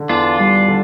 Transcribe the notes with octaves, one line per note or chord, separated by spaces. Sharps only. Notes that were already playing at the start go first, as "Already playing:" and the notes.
Already playing: D3
E2 D4 F4
G3
D3